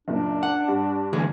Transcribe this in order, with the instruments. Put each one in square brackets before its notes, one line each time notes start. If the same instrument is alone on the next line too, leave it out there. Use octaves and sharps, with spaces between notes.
[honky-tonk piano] F#1 A#2 [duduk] D4
[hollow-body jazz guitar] F#5
[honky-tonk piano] G2
[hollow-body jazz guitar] D2 E3 G#4